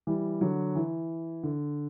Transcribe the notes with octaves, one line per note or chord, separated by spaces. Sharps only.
E3 G3
D3 F#3
E3
D3